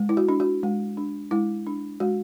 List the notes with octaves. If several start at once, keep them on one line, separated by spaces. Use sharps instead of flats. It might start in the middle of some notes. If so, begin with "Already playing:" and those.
Already playing: G#3
E4
F#4
D4
F#4
G#3
D4
G#3 E4
D4
G#3 F#4